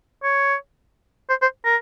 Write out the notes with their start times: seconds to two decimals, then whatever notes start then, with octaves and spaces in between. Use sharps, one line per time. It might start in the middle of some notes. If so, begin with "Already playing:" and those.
0.23 C#5
1.30 C5
1.42 C5
1.65 A#4